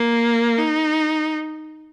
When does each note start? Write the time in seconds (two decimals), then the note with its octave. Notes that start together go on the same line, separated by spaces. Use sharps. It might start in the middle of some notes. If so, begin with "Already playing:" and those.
Already playing: A#3
0.57 D#4